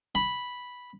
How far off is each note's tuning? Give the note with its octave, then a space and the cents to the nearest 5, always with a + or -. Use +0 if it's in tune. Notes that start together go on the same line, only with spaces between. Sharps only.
B5 -5